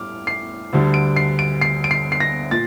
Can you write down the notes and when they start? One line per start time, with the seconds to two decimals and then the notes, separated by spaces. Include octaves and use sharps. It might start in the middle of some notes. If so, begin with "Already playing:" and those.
Already playing: A2 G3 D6 F6
0.27 C7
0.73 D2 D3 G3
0.94 D7
1.16 C7
1.39 D7
1.61 C7
1.84 D7
1.91 C7
2.12 C7
2.20 A#6
2.51 A#2 A6